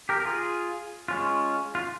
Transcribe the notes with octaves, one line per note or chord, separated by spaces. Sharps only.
G4 A#4
A#4
F4 G#4
G#3 C#4 F4
F4